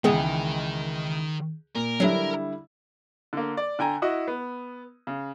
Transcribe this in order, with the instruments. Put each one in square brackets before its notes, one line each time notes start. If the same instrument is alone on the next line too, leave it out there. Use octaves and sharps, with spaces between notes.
[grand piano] C#2 E3 G5 [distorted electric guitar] D#3 D#5 [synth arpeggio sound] G#3 B3 G#4
[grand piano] A#2 [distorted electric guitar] A#4
[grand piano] D3 G3 E4 [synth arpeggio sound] F#3 D4
[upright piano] D3 A#3
D5
D3 G5 G#5 A#5
E4 F#4 D#5
B3
C#3